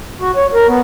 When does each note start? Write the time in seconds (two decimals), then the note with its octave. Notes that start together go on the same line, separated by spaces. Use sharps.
0.20 F#4
0.36 C#5
0.53 A#4
0.68 B3